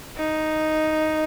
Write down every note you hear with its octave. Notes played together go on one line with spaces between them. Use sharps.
D#4